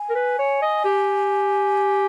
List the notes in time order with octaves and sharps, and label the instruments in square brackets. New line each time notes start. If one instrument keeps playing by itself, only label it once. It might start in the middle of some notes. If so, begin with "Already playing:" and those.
Already playing: [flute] G#5
[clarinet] A#4
B4
C#5
D#5
G4